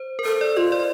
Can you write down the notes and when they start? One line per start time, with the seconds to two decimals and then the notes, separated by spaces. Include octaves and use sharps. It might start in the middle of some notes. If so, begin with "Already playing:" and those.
Already playing: C5
0.19 A#4
0.25 A4 C5
0.41 D5
0.57 F4 D#5
0.72 D5